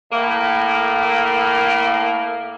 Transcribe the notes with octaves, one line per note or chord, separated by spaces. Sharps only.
A2 A#3